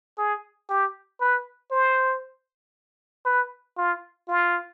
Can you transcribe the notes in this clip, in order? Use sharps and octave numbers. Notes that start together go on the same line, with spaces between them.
G#4
G4
B4
C5
B4
F4
F4